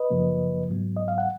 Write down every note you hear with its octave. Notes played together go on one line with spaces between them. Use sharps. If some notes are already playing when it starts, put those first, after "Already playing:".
Already playing: B4 D#5
F#2 C#3 F3 A#3
G#2 F#3 B3
D#5
F5
F#5